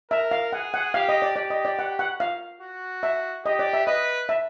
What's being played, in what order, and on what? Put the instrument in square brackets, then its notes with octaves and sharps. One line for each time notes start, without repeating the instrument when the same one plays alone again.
[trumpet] A#4 [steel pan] E5
[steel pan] F5
[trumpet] G#4 [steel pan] F#5
[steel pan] F#5
[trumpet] G4 [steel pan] F5
[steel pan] D#5
D5
[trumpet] G4 [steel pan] D5
[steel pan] D#5
D5
F#5
F#5
F5
[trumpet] F#4
[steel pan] E5
[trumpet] G4 [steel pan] D#5
[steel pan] D5
E5
[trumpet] B4 [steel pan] D#5
[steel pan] E5